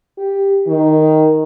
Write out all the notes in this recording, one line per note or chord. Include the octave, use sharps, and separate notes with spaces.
G4
D#3